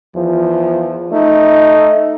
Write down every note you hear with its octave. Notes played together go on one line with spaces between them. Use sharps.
E2 F3
A3 D#4